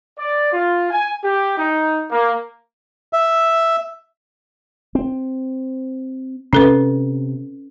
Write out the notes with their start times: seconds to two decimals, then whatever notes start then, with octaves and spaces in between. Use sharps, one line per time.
0.19 D5
0.52 F4
0.91 G#5
1.23 G4
1.57 D#4
2.10 A#3
3.13 E5
4.95 C4
6.53 C3 C#4 A4 B4